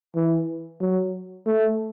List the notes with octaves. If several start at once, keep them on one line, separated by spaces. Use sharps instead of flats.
E3
F#3
A3